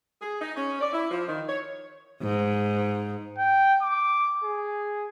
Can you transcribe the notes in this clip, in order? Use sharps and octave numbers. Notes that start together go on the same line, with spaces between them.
G#4
D#4
C#4
D5
E4
F3
D#3
C#5
G#2
G5
D6
G#4